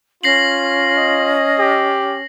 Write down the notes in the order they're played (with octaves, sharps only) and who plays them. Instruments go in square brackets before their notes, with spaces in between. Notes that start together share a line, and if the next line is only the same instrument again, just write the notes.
[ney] C#4 [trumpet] F4 [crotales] A#6 C7 F#7
[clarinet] D#5
[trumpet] G4